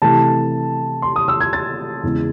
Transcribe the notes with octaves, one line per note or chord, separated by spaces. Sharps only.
C3 E3 A3 A5
C6
D#6
E6
G#6
A6
E2 C#3 G#3